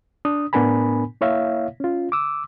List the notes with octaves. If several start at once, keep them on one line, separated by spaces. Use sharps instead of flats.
D4 D#6
A2 B3 D4 A#4 G#5 B5
A#3 E4 C#5 E5 F5
C#4 F4
D6 E6